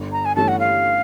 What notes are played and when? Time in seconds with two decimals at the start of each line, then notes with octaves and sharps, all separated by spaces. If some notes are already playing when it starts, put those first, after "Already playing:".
Already playing: G1
0.12 A#5
0.25 G#5
0.36 G2 E3 A3 C#4 A5
0.48 F#5
0.60 F5